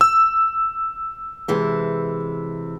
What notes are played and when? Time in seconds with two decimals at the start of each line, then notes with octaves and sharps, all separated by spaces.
0.01 E6
1.48 C3 E3 G#3